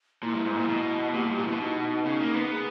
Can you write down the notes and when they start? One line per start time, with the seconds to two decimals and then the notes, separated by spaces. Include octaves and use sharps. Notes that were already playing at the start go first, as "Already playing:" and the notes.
0.23 A#2 E4
0.34 G2
0.45 G#2
0.57 A#2
0.68 B2
1.14 A#2 G4
1.25 G2 G4
1.37 A#2
1.45 B2 E4
1.60 D#4
2.05 C#3
2.21 A#3
2.36 B3
2.51 G#4